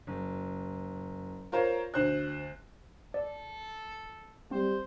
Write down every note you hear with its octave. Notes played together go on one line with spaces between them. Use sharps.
F#1
F4 A#4 C5 C#5
D2 C5 F#6
A4 D5
G3 C4 C5